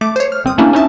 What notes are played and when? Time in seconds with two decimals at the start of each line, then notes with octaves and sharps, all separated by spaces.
0.01 A3 D6
0.16 C5 C#5
0.32 F6
0.44 G1 C4 D#6
0.58 A3 A#3 C#4 D4 E4 G4
0.73 C#4 D#4 E5 A5